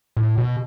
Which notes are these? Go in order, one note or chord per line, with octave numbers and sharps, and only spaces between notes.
A2
B2